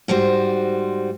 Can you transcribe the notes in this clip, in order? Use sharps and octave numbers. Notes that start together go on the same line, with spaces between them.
G#2 G3 F#4 C5